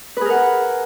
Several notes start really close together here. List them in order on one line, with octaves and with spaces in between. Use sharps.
B4 G#4 A#4 F#5